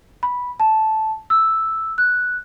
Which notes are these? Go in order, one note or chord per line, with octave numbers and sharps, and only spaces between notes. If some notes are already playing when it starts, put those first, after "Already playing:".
B5
A5
E6
F#6